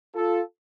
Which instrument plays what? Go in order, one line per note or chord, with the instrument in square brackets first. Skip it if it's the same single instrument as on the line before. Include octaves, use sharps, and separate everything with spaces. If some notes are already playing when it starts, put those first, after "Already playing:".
[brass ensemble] F4 A4